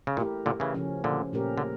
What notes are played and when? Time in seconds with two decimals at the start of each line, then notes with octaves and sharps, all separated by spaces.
0.07 C#3
0.17 A#2 A3 E4 G4 A#4
0.46 A#2 D3
0.60 C#3 E3
0.74 C#3 F3 C#4
1.04 A#2 D3
1.33 A#2 A3 C#4 G4 A#4
1.58 D3